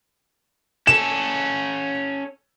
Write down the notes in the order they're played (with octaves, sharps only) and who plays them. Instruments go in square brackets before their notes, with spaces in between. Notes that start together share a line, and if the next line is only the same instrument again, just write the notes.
[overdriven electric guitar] C#4 A4 [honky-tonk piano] E7